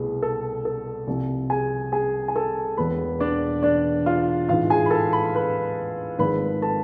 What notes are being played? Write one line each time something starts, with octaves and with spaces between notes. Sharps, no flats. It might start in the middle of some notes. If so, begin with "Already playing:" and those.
Already playing: C2 B2 A3 E4 G#4
A4
A4
C2 C3 F3
G#4 G#5
G#4 G#5
G#5
A4 A5
E1 E2 B2 B4 B5
D4 D5
D4 D5
F4 F5
A1 G#2 E3 F4 F5
G#4 G#5
B5
A4 A5
B5
B4 B5
G#1 G#2 F3 G#3 C4 B4 B5
A4 A5